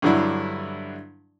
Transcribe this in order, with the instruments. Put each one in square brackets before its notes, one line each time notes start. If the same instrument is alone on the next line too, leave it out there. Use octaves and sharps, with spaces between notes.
[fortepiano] G2 D3 F#3 D4 E4